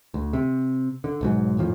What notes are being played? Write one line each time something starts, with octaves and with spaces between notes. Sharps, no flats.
D2
C3
D3
B1 G#2 F#3
G#1 F2 A2 F3